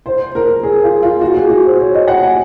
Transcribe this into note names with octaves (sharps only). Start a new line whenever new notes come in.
C5
A#4
G#4
F4
F4
F#4
G#4
F#4
C5
C#5
D#5
F#5
G#5